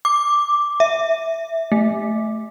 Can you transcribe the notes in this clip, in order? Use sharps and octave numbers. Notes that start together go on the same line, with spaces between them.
D6
E5
A3